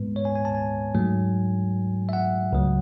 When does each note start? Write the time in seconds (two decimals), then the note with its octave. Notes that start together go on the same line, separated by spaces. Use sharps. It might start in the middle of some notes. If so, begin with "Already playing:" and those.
Already playing: G#2 G#3 B3 B4
0.16 C#5
0.25 G#5
0.35 G#5
0.45 A5
0.55 G#5
0.95 G#2 F#3 A3
2.09 E5
2.13 F#5
2.53 C#2 C#3 F#3